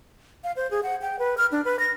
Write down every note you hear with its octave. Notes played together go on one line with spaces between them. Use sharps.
F5
C5
G#4
F#5
G5
B4
F6
D4
B4
A#6